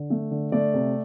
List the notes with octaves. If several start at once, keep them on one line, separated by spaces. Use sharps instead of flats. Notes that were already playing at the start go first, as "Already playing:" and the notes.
Already playing: D3
A3
D3
A3 D5
C3